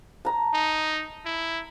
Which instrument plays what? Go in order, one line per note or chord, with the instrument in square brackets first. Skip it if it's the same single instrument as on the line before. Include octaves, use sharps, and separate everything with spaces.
[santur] A5 A#5
[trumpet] D#4
E4